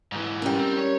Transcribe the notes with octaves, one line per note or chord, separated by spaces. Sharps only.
G#2 E3
G3 C#4 A#4
C4
C#5